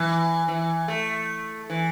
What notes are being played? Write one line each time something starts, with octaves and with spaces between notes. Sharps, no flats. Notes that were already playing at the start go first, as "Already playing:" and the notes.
Already playing: E3
E3
A3
E3